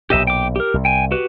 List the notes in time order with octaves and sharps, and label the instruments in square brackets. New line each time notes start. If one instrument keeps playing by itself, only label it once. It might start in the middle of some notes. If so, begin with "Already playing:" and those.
[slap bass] B1 A#2 [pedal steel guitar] G4 D#5 E5
[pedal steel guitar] G5 D6
G4 A#4
[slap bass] C2
[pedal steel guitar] G5 G#5
F#4 G4 B4